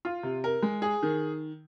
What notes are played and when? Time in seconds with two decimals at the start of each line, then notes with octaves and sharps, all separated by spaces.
0.05 F4
0.23 C3
0.44 A#4
0.62 G#3
0.82 G#4
1.03 D#3